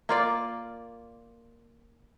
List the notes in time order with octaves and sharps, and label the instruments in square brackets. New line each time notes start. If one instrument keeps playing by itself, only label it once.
[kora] A#3 F4 D5